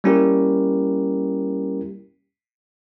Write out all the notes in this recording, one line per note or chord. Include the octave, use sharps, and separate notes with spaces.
G3 A#3 C#4 E4 G4 A#4